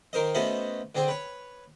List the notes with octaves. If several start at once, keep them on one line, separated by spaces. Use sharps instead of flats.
D#3 A#4 C5 D#5
A3 B3 C#4 F#4 C5 D#5
D3 C4 G#4 C5
B4 C#5